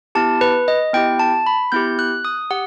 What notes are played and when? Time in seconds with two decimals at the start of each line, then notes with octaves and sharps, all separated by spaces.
0.15 B3 E4 G4 A5
0.41 B4
0.68 D#5
0.93 B3 E4 G4 G5
1.19 A5
1.46 B5
1.72 B3 E4 G4 G6
1.99 F#6
2.25 D#6
2.51 G4 F#5